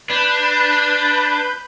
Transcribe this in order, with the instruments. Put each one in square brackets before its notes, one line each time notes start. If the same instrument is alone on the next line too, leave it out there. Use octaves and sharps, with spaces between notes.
[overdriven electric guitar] D4 [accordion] B4 B5 G6